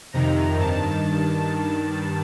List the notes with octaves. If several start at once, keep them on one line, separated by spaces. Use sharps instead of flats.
F2 C3 D#3 A#5
G2 D#3 A5